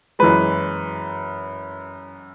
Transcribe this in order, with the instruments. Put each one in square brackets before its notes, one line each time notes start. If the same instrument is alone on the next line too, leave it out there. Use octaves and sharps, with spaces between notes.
[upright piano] F#2 E3 G#3 B4